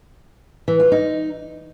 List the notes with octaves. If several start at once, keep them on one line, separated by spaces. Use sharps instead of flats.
E3
F4
D#4